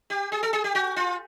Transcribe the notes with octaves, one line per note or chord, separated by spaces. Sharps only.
G4
G#4
A4
G#4
G4
F#4
F4